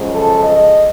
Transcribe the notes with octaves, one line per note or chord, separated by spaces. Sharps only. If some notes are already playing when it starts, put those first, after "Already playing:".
Already playing: F#2 C#3 F3 G#3
A4
D#5